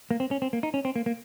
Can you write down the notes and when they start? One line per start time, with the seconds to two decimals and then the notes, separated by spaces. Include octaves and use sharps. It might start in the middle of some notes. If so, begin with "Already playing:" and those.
0.11 A#3
0.20 C4
0.31 C#4
0.42 C4
0.53 A#3
0.63 D#4
0.74 C#4
0.85 C4
0.96 A#3
1.06 A#3